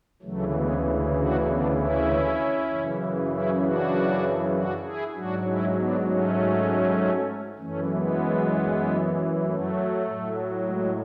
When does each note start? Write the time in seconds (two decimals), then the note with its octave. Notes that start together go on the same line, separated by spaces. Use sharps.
0.22 D2 C#3 E3 F#3 A3
0.53 G#3 B3
1.15 D4 F#4
1.45 B3 D4
1.76 C#4 E4
2.67 F#2 C#3 E3
3.29 C#4 E4
3.60 D4 F#4
4.52 D4 F#4
4.82 E4 G#4
5.13 G#2 F#3 D4 F#4
5.44 C#4 E4
5.75 B3 D4
6.05 A3 C#4
7.58 F#2 E3 A3 C#4
7.89 G#3 B3
9.43 F#3 A3
10.04 A2 F#3
10.66 G#3